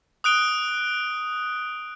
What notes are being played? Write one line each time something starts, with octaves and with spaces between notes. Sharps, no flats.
D#6 F#6 D7 G7